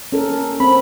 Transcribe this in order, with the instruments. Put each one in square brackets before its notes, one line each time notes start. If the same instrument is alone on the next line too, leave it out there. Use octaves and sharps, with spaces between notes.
[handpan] C#4 A4 A#4
[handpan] C4 [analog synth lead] B5